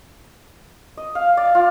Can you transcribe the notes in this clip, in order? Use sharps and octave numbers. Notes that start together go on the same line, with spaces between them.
D#5
F5
D5
F4